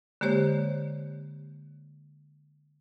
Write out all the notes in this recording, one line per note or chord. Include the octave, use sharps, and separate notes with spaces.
D3 G#3 A#3 G4 C5 C#5